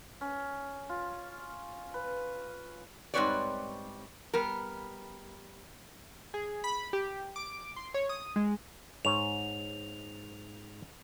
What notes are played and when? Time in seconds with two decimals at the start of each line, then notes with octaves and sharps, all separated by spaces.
0.21 C#4
0.89 F4
1.94 B4
3.14 G#2 G3 C4 B4 C#5 D5
4.33 G3 B3 A#4
6.34 G#4
6.64 B5
6.93 G4
7.36 D6
7.76 C6
7.94 C#5
8.09 D#6
8.36 G#3
9.05 G#2 C#5 F7